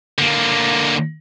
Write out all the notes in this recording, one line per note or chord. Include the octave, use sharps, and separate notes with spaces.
D3 A#3